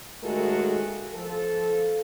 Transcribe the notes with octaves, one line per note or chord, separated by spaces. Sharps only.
D#2 G#3 A3 F#4 A4 A#4
F3 A4